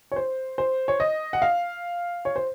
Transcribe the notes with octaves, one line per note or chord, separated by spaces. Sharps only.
C#5
C5
C5
C#5
D#5
F#5
F5
C#5
C5